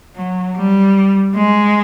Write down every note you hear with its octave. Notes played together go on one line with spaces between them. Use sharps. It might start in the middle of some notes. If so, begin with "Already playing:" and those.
F#3
G3
G#3